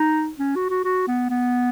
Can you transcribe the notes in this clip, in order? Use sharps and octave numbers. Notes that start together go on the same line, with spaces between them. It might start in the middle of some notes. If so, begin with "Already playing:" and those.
Already playing: D#4
C#4
F#4
F#4
F#4
B3
B3